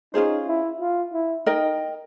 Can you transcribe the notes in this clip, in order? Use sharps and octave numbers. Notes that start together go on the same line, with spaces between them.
C#4 D#4 F4 G#4 C5
E4
F4
E4
D#4 A#4 D#5 G5